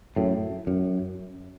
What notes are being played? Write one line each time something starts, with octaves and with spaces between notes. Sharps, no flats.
F#2 A2
F#2